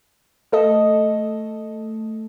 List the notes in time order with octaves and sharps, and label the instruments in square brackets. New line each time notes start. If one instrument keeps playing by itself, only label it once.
[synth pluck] A3 A4 D#5